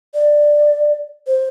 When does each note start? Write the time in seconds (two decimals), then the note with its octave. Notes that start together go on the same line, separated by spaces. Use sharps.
0.14 D5
1.27 C5